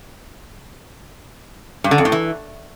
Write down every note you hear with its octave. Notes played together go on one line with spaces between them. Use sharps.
G2
D3
F2
A2
E3